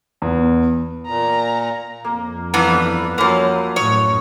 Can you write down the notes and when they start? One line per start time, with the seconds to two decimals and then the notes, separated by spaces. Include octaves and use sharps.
0.22 E2
1.07 A#2 A#5
2.04 F2 A#3
2.54 G2 E3 B3 D4
3.18 F3 F#3 A#3 C#4 B4
3.76 F#2 A2 C#5 D#5